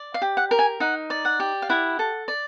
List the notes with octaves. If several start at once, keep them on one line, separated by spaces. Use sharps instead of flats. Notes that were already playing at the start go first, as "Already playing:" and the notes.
Already playing: D5
F5
G4
F#5
A#4
G#5
D#4 F#5
D5
F#5
G4
F5
E4 F#5
A4
D5